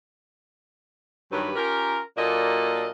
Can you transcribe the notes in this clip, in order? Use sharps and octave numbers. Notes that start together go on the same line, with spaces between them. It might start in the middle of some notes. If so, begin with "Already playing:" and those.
G2 D#3 F#3 G4 B4
C#4 F4 G4 A#4
A#2 F#3 A#3 D4 A4 D#5